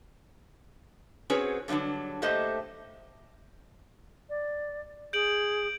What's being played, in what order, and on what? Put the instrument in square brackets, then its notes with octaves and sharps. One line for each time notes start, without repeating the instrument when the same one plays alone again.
[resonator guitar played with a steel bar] C4 C#4 F#4 G#4 B4 C#5
D3 E3 F#3 G3 D4
A2 A3 A#3 G4 C5 D#5
[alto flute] D5
[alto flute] G#4 [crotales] G6 D7 F#7